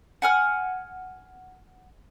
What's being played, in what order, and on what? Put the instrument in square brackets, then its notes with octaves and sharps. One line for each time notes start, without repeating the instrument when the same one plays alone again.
[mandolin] F#5 G#5 F6